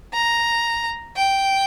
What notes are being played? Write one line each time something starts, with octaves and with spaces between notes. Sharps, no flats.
A#5
G5